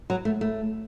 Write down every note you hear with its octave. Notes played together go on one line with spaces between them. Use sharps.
F#3
A3
A3